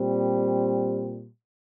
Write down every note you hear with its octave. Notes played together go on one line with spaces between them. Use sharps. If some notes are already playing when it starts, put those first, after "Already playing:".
Already playing: A#2 G3 C4